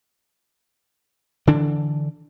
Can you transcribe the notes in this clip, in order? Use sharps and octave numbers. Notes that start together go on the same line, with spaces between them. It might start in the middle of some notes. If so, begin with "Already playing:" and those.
D3 E3 D4